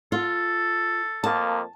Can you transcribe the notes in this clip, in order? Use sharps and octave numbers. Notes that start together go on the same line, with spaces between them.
F4 A4
F2 A#3 A5